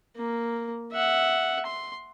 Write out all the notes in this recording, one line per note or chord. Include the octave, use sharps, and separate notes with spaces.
A#3
E5 F#5
C6